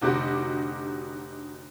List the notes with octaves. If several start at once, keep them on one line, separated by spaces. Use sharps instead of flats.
F1 D3 D#4 F#4 G4